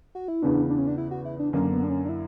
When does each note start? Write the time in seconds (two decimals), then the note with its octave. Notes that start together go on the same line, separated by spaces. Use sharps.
0.15 F#4
0.28 E4
0.42 E2 C#3 E3 B3 D4
0.70 D4
0.78 C#4
0.87 D4
0.98 E4
1.11 F#4
1.25 E4
1.39 D4
1.53 F#2 D3 A#3 C#4
1.72 B3
1.84 D4
1.90 C#4
2.05 D4
2.09 E4